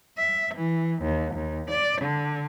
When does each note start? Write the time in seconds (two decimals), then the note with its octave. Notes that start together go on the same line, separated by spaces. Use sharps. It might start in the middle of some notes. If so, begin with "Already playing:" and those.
0.18 E5
0.55 E3
1.03 D#2
1.35 D#2
1.70 D5
2.02 D3